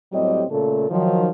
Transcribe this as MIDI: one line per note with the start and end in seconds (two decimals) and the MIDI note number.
0.13 0.44 45
0.13 0.44 54
0.13 0.44 55
0.13 0.44 60
0.13 0.44 67
0.13 0.44 75
0.51 0.86 46
0.51 0.86 49
0.51 0.86 57
0.51 0.86 69
0.90 1.29 51
0.90 1.29 53
0.90 1.29 54